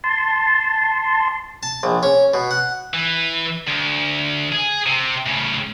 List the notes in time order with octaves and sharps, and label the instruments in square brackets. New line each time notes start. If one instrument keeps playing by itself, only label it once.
[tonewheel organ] A5 C6
[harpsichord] A5
A#1
C#4
B2
F#5
[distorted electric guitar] E3
D2
G#4
C3
A2 C#3